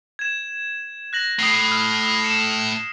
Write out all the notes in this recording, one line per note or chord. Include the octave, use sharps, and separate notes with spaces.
G#6 E7
F#6 A#6 F#7
A2 D#6 C7
F6
C#7 E7